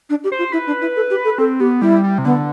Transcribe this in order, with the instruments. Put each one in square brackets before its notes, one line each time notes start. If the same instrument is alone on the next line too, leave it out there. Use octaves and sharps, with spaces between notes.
[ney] D4
G4
[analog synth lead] C5
[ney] F4
[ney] E4 [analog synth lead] B4
[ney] D4
E4
A4
G4
A4
[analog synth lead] C4 [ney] A4
[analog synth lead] B3 [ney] G4
[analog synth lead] G3 [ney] E4
[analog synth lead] G3
C3
[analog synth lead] D3 [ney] B3